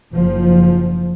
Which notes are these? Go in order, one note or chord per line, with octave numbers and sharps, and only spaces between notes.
F#1 F3